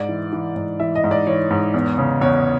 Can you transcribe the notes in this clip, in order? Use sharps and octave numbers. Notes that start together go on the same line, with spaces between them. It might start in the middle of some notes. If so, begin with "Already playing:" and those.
Already playing: G#2 D5
E3
E3
G#2
E3 E5
D#5
G#2
D5
E3 C#5
G#2
E2
C#3
E2 C#5